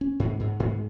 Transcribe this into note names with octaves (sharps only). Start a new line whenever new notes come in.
C#4
G#2
G#2
G#2